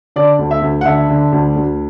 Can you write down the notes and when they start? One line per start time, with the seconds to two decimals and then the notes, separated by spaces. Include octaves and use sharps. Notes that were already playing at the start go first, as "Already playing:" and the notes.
0.16 D3 D5
0.39 D2
0.51 E5
0.62 D2
0.81 F#5
0.85 D3 E5
1.09 D3
1.32 D2
1.56 D2